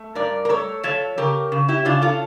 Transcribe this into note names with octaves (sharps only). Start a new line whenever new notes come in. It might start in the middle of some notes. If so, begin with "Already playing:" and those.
Already playing: A3
G2 A#4 D5
A#4
A3 A4 C#5
F3 A4 C#5
C#3 G4 A#4
C#3
E4 G4
C#3 D4 F4
F4 A4